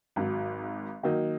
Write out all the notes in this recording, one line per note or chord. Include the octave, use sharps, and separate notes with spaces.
G#1 G#2 F#3
D#3 F#3 A#3 D#4